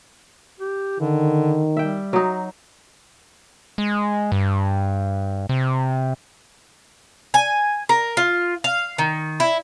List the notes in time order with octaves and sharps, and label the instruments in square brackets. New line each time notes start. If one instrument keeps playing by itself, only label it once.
[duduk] G4
[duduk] D3 [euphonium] D#3
[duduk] G3 [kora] E5 G5
[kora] F#3 D#4
[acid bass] G#3
G2
C3
[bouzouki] G#5
A#4
F4
F5
D#3
E4